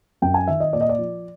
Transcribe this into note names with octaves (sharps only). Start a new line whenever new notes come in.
F#2 G5
G#5
D#3 E5
D#5
A#2 D5
D#5
D5
F3